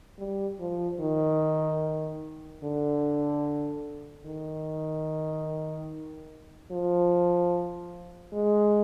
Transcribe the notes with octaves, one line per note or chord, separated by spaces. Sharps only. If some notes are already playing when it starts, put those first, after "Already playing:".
G3
F3
D#3
D3
D#3
F3
G#3